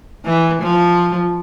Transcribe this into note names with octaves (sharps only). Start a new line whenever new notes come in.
E3
F3